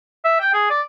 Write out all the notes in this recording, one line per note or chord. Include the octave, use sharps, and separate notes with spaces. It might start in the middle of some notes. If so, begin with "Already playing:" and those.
E5
G5
G#4
D5